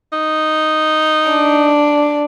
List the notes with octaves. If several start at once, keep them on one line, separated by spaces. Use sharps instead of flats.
D#4
D4